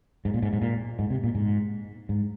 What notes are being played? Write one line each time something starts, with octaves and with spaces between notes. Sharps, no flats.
G#2
A#2
G#2
G#2
A#2
G#2
C3
A#2
G#2
G#2